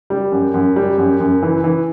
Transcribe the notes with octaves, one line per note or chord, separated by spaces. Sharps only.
G3
F#2
F#2
G3
F#2
F#2
E3
E3